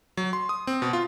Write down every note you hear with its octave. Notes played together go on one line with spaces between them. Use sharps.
F#3
C6
D#6
C4
B2
F4